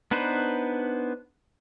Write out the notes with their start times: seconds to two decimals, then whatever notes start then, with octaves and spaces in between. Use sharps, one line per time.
0.11 B3 D4 D#4 B4 C5